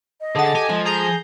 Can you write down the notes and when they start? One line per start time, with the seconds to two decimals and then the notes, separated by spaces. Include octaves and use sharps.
0.21 D#5
0.35 D3 G#4 A4 F#5 A6
0.55 G4 G#5
0.69 F3 G#3
0.85 G#4 A#5 G6